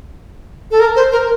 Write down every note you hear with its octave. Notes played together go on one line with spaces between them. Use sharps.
A4
A#4
C5
A#4